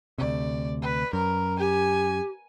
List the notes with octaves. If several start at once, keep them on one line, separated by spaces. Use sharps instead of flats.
D2 C3 D5
B4
F#2 A#4
G4 G#5